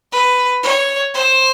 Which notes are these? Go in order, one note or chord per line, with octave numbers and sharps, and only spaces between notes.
B4
C#5
C5